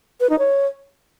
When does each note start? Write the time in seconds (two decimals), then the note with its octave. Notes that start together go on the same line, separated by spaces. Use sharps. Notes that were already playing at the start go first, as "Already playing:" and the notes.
0.21 B4
0.30 D#4
0.39 C#5